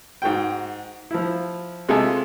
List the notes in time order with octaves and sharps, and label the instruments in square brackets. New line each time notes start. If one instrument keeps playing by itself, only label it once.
[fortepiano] G#2 F#4 G5
F3 E4
C3 G#3 F4 A4 E5 G#5